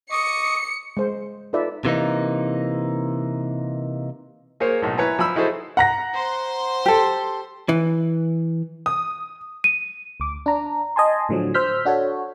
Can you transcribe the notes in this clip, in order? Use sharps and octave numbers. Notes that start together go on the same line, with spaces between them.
D#5 C#6 D6 C#7
G#3 C5
D#4 F4 A4 B4 D5 E5
C3 E3 A#3 D#4
A#3 G#4 A#4 C5 C#5
B1 A2
E4 B4 C#5 G#5 A#5
F3 G#5 B5 E6
D#4 E4 F#4 G#4 A4 C5
F#5 A#5 A#6
C5 C6
G4 A4
E3
D#6
D#7
D2 D6
D4 A#5
D#5 G#5 A5 C6
A2 D3 F3 F#3
C5 E6 F6 G6 B6
D4 F#4 A4 C#5